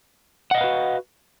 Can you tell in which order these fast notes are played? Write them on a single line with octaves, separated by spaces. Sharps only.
F#5 D#5 F5 B4 F#4